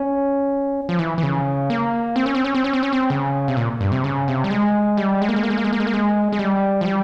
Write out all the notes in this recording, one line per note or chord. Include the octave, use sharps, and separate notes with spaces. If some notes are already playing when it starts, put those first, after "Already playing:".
Already playing: C#4
F3
E3
E3
C#3
A#3
C4
C#4
C4
C#4
C4
C#4
C4
C#4
C4
C#3
C3
A#2
G2
C3
C#3
C3
G3
G#3
G3
G#3
A#3
G#3
A#3
G#3
A#3
G#3
A#3
G#3
A#3
G#3
G#3
G3
F3
G3